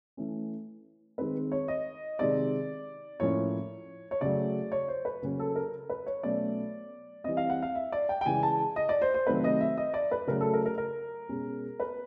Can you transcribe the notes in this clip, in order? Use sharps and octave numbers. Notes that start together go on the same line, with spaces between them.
E3 A3 C#4
D#3 G#3 C4 B4
C#5
D#5
C3 D#3 G#3 C4 D5
A2 F3 A#3 C#4 C#5
C#5
C#3 F#3 A3 D5
C#5
C5
B4
C#3 F#3 A#3 C#4
A4
A#4
B4
C#5
B2 F#3 A3 C#4 D5
E3 G3 C4 D#5
F5
F#5
F5
E5
D5
G5
G5
C#3 E3 G#3 G#5
A5
D#5
D5
C5
C5
C3 D#3 F#3 A3 C4 B4
D#5
E5
D#5
D5
B4
C#3 F#3 A3 C#4 A#4
A4
A#4
A#4
A#4
B2 G#3 C#4
B4